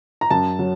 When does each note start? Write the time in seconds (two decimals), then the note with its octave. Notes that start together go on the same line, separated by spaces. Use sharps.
0.21 A#5
0.30 F#2 A5
0.59 F#3